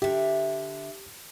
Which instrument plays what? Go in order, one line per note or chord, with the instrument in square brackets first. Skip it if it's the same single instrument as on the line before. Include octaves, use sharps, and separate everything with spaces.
[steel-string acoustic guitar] D3 E5 [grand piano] G4